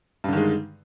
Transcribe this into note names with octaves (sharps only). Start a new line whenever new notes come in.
G2 D3 D#3 G#3